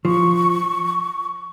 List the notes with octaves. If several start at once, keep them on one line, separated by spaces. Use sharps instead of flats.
F3 C#6